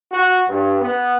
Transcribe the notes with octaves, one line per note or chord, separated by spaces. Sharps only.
F#4
G2
B3